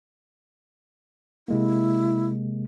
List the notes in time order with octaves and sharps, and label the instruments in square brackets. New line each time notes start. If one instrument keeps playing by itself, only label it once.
[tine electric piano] C3 G#3 A#3 [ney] E4